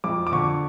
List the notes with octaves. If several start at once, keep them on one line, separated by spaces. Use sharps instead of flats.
F2 D6
D6
D3 C#6